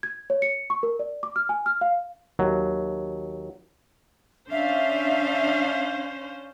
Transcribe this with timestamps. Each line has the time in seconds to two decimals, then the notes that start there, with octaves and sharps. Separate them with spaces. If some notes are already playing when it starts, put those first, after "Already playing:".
0.03 G#6
0.30 C#5
0.42 C#7
0.70 C#6
0.83 A#4
0.99 D5
1.23 D6
1.36 F6
1.49 G#5
1.66 F6
1.81 F5
2.39 D#2 F#3
4.51 C#4 D4 C5 E5 F5